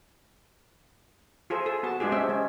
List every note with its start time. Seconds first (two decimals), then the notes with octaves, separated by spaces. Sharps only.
1.50 F4 G#4 A4 C5
1.66 G#4 A4
1.83 B3 F#4 A5
2.00 G#3 D4 F4 G4 G#4
2.12 G#3 C4 C#4 E5
2.29 G#3 C#4